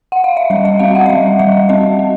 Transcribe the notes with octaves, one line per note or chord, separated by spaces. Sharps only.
F#5
F5
E5
G3 D#5
E5
C4 F5
F#5
D#5
G3 E5
G3 E5
C4 D#5
C4